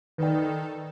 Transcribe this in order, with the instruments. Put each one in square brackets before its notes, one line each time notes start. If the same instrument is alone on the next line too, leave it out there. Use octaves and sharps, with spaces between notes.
[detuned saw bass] D#3 [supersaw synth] D#4 A4 [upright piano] B4 D5 G5